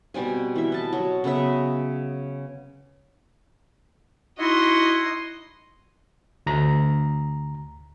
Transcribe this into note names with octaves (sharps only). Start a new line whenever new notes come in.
B2 G3 C4 G#5
E3 E5
D#5 A5
F#3
C#3 B3 D#5 E5
D#4 E4 F#4 D#5 C6
D2 A#5